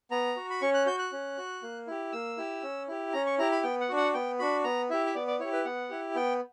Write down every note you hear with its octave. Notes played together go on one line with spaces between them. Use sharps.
B3 A#5
F#4
B5
C#4 C#6
F#6
F#4 G6
F#6
C#4
F#4
A#3
E4 G4
A#3 E6
E4 G4
C#4
E4 G4
C#4 A#5
C#6
E4 G4 A#5
B5
B3 G5
F#5
D4 F#4
F#5
B3 G5
D4 F#4 B5
B3 A#5
E4 G4 E5
E5
B3 D5
D5
E4 G4 C#5
B4
B3 F#5
E4 G4
B3 G5